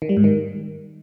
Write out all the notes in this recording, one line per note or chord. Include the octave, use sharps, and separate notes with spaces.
D#3
G3
G#2
D#3